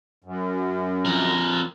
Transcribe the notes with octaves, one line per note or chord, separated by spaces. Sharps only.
F#2
F2 A#4